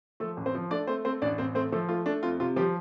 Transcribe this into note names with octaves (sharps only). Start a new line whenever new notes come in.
F3 A3 A4
A1
C4 C5
F3
A3 D4 D5
A3 C4 C5
A3 C4 C5
A1 D4 D5
A1 C4 C5
A3 C4 C5
F3 A3 A4
A3 F4
A3 D4
F2 F4
C3 F4
F3 G3 G4